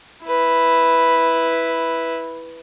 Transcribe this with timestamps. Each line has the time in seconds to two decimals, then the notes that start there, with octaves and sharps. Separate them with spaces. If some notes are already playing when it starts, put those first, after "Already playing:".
0.25 E4 B4